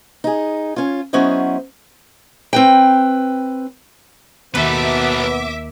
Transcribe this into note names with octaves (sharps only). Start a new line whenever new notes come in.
D#4 G#4
C#4 F4
F#3 B3 C#4 E4 C5 D#5
C4 B4 G5
D#2 B2 B3 A4 B4 E5 D6